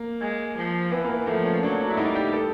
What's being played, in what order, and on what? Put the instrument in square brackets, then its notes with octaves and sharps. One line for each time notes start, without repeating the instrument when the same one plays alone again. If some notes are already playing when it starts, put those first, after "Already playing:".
Already playing: [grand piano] A#3
[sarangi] G#3
F3
[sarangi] E3 [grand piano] B3
[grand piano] A#3
B3
[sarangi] F3 [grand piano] A3
[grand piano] C#4
[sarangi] F#3 [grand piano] D4
[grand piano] D4
E4
[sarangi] G3 [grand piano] D#4
[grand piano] G4
A4